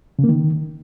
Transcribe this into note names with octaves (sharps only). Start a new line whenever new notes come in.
C#3
A#3
D#3